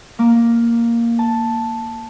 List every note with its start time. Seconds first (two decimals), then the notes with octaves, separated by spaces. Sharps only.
0.19 A#3
1.19 A5